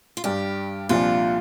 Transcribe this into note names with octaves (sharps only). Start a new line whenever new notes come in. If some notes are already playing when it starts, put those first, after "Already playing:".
F4
G2 G3 D4 G4
C2 A#2 F3 D4 F4